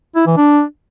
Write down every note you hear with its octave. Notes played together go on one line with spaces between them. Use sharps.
E4
E3
D4